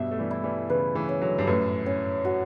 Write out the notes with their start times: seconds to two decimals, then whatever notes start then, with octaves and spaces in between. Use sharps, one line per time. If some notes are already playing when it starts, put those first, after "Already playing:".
Already playing: G2 B2 E5
0.11 A3
0.19 E3 G3
0.31 E4
0.44 E3 G3
0.70 C#3 E3 B4
0.95 C#3 E3
1.09 C#4
1.22 D3 F#3
1.38 G2
1.47 F#2 A2 B4
1.86 C#4
2.25 F#4